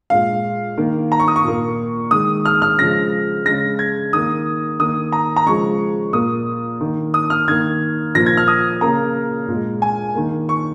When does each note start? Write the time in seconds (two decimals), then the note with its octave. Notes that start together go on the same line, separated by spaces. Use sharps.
0.10 A#2 G#3 F5
0.78 D#3 A#3
1.12 A#5
1.20 C#6
1.28 D#6
1.36 C#6
1.44 A#2 A#3
2.11 D#3 G#3 D#6
2.45 F6
2.62 F6
2.78 C#3 F3 G#3 A#6
3.45 C#3 G#3 A#6
3.79 G#6
4.13 D#3 A#3 D#6
4.79 D#3 A#3 D#6
5.12 A#5
5.36 A#5
5.47 C#3 F3 G#3 C#6
6.13 A#2 A#3 D#6
6.81 D#3 A#3
7.14 D#6
7.30 F6
7.48 D#3 A#3 G#6
8.15 A#2 F3 A#3 A#6
8.26 G#6
8.37 F6
8.48 D#6
8.81 C#3 A#3 A#5
9.48 A#2 G#3
9.82 G#5
10.15 D#3 A#3
10.49 C#6